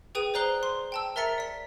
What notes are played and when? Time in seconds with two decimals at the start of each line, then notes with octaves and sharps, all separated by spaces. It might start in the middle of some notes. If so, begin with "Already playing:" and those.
0.15 G#4 B4 G5 D#6 D#7 F7
0.34 C5 D5 A#5 F#6 C7 G7
0.63 C6
0.92 G5 A5 E6
1.16 A#4 E5 A#5 A6 B6 C#7
1.38 D5 B6